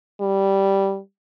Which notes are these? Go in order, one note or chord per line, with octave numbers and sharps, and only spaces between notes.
G3